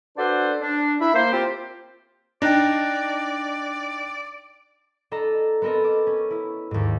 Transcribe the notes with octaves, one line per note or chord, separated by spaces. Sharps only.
D4 F#4 A4 B4 C5 D5
D4
E4 E5 B5
A#3 C5
C4 F4 G4
D4 D#4 D5 G5 F#6 A#6
D4 A4 D#5 A#5
B3 C4 A4 A#4 D#5
D6
C#4
E4
D#2 G#2